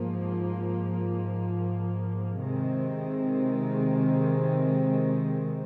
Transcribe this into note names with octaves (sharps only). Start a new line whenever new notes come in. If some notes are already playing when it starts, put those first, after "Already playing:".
Already playing: G#2 F3 A#3
C3 D#3 G#3 C4